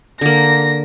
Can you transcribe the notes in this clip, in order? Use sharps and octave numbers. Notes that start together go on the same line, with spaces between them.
D3 A#3 A#6